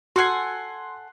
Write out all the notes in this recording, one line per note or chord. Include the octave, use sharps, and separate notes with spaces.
F#4 A4 F#5 G#5 C6 F6 F#6 C7